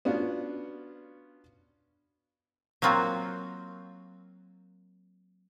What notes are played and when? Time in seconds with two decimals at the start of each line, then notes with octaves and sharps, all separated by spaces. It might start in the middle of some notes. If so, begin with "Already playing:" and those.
0.05 B3 C#4 D4 F4 F#4
2.82 F#3 A#3 C4 F4 F#4